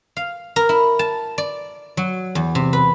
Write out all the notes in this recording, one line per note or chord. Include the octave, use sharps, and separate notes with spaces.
F5
A#4
E4
A5
D5
F#3
E2
C3
B4